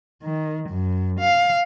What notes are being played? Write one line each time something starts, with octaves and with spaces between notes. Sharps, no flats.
D#3
F#2
F5